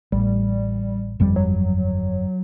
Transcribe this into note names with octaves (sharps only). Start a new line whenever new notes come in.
A1 G3
G1 F2 G3
F#3